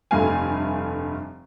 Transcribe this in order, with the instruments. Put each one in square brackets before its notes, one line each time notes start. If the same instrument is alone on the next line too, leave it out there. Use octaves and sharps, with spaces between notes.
[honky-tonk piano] F1 G2 A3 F5 G#5